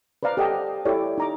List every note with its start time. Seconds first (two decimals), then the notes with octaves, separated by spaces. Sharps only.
0.23 B4 C5 D5 F5 A#5
0.37 G4 A4 D#5 F#5 G5 A5
0.85 E4 G4 A4 C#5 D5
1.18 D#4 A#5 D6